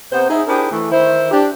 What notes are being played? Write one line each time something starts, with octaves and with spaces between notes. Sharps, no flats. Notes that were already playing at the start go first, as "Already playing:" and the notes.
C3 B3 C5
D#4 E4 G#4
D4 E4 G4 G#4 A#4 C5
E3 A3
D#3 E4 C5
D4 G4